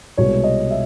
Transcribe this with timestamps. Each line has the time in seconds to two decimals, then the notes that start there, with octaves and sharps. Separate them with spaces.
0.17 C2 B2 G#3 C#5
0.44 D#5
0.71 E5